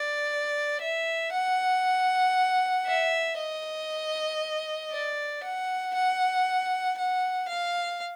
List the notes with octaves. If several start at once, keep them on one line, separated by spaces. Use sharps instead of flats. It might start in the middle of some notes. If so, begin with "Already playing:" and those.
Already playing: D5
E5
F#5
E5
D#5
D5
F#5
F#5
F#5
F5